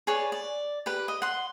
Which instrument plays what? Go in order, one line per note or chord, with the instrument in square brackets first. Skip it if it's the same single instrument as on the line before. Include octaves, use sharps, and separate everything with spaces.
[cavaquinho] G#4 B4 C#5 D5
D5
G4 B4
D#5
F#5 C6